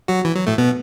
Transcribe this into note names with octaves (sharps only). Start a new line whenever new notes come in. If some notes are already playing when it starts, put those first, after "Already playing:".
F#3 F#4
E3
F#3
A2 A3
B2 B3